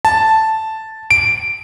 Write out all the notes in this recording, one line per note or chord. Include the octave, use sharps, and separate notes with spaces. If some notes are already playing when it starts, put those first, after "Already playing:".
A5
D7